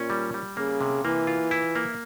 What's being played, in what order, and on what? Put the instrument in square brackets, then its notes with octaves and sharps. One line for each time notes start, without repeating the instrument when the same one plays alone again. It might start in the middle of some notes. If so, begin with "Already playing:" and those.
Already playing: [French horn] A#2 [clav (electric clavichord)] C#4
[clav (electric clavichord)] G3
G3
[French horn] C#3 [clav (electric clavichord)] A#3
[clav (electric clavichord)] C3
[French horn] E3 [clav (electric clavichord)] A#3
[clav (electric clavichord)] F4
E4
A#3